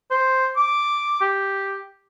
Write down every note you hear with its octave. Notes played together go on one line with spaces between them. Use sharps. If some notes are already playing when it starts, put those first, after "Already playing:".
C5
D6
G4